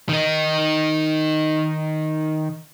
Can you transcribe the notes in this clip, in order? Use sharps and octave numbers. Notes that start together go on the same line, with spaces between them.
D#3 D#4